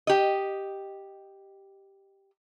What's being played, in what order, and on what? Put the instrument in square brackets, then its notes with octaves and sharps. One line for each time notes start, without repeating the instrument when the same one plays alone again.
[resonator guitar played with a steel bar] G4 D#5